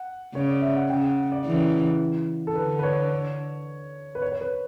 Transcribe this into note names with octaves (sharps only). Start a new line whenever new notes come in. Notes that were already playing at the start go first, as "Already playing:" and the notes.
Already playing: F#5
C#3 C#5
D5
E5
F#5
C#3 G5
F#5
D5
C#3 E3
A4
D3 B4
B4
C#5
B4
C#5
C#5
B4